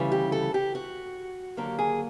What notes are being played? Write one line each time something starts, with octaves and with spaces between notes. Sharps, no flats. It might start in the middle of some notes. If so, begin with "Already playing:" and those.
Already playing: D2 C#3 E3 G3
G4
A4
G4
F#4
D#2 D3 F#3 A#3 G4
G#4